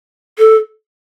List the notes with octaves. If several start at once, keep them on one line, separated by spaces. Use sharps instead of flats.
A4